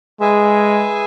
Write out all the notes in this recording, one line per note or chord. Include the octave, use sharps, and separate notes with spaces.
G#3 G#4 B4 E5 G#5